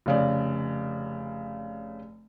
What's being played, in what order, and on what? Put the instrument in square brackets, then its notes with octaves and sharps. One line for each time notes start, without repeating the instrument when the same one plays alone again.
[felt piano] F1 C#3 D5